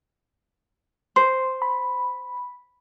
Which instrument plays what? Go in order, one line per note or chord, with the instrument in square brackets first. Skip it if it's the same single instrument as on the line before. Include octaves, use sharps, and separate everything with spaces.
[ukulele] C5 [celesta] C6
[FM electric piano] B5